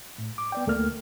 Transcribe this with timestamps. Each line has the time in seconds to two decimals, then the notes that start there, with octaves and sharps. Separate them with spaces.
0.18 A2
0.38 D6
0.52 B3 D5 G5
0.67 D2 A3 A#3 F6